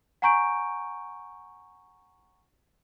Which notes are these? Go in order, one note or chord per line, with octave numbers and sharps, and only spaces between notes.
F#5 G#5 A#5 C#6 G6 D7